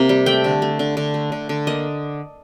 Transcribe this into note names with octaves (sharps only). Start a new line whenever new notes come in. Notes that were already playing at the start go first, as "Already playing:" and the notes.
Already playing: C3 A#3
G3
A3 G5
D3
A3
D3
D3
A3
D3
D3
A#3 D#5